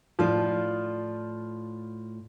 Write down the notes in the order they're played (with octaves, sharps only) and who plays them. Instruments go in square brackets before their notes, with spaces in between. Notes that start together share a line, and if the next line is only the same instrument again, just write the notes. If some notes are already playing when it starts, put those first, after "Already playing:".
[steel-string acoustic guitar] A2 F4 D5 [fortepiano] F3